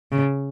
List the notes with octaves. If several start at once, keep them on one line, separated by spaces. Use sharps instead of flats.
C#3